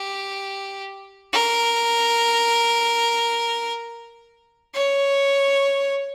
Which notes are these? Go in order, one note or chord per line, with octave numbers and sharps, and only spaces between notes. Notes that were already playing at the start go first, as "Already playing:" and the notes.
Already playing: G4
A#4
C#5